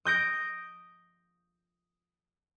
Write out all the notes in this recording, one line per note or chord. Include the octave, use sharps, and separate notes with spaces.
D#6 G6 A#6 D7